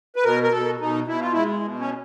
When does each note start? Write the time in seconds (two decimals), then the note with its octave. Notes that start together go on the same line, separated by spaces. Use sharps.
0.16 B4
0.24 B2 A#4
0.43 A#4
0.52 B2 A4
0.80 B2 D#4
1.07 B2 E4
1.20 F4
1.32 G#3 E4
1.63 B2
1.80 C#4